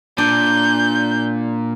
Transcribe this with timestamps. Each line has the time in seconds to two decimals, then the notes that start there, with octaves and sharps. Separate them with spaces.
0.18 A#2 D4 G6